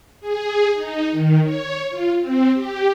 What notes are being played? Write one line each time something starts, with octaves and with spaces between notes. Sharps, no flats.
G#4
D#4
D#3
C#5
F4
C4
G4